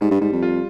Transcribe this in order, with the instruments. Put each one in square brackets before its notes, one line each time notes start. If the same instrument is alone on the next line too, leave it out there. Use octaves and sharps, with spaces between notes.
[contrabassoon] G#2 [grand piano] G3
[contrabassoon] G2
[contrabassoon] G#2 [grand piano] G3
[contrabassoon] F2
[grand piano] F4